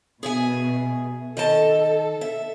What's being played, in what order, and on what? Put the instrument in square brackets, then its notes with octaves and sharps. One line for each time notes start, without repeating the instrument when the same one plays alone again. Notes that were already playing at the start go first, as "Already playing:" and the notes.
[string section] B2 [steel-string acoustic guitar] G#4 E5 G#5
[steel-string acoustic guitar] D#3 D#5 A5 [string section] A4
[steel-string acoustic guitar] E5